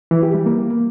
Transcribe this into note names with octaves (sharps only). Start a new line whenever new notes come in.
E3
G4
G3
A#3